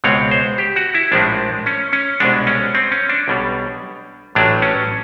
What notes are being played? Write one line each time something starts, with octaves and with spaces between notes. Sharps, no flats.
C#2 B2 G#3 C4 C#5
C5
G4
F#4
E4
A#1 A2 F3 G#3 C4 D4
C#4
C#4
C2 B2 G#3 D4
C#4
C4
C#4
D4
B1 B2 G3
A1 A2 F#3 D4
C#4